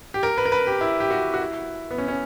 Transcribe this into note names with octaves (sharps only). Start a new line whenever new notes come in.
G4
A#4
B4
A#4
B4
G4
E4
G4
F#4
F#4
E4
B3
C#4
C#4